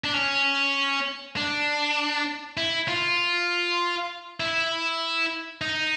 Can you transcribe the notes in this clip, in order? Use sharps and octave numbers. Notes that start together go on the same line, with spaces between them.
D4
C#4
D4
E4
F4
E4
D#4